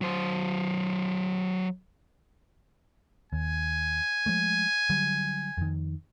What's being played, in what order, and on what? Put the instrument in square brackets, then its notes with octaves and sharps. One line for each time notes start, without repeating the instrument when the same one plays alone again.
[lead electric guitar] F#3 C5
[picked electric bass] D#2 [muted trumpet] G#5
[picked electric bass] F3 G#3 A3
D3 F#3 G3
F2 D#3